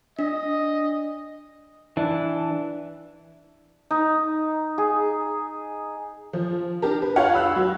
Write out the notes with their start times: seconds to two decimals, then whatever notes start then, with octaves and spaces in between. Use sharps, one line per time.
0.19 D4 D#5
1.97 E3 D4
3.91 D#4
4.78 G#4
6.33 F3
6.82 D4 G4 A#4
7.02 B4
7.16 F4 G4 C#5 F5 F#5
7.34 B5 E6 F#6
7.56 F#3